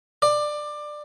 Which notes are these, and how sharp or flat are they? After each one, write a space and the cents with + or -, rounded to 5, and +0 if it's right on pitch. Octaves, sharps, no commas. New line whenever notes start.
D5 +20